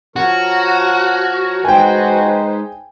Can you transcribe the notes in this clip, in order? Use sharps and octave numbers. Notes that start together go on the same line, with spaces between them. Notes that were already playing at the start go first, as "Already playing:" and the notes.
F3 F#4 A#4 C#5
G#3 D#4 B4 C5 G5 G#5